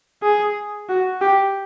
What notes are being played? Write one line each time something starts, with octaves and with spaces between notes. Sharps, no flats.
G#4
F#4
G4